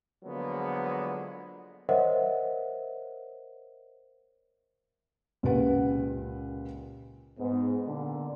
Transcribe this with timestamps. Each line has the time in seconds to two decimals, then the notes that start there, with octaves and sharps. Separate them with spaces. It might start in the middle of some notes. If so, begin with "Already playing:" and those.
0.24 D3 F3 F#3 G#3 A#3 B3
1.89 A#4 C5 C#5 D#5 E5 F#5
5.43 C#2 A#2 C#3 G4 B4 F#5
7.39 G#2 B3
7.87 A#2 D3